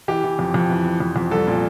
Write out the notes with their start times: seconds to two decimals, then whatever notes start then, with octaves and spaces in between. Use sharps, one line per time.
0.08 E3 G4
0.24 E3
0.39 F2
0.54 F2
0.70 E3
0.86 E3
1.00 F2
1.16 F2
1.31 C2 A4
1.47 A#2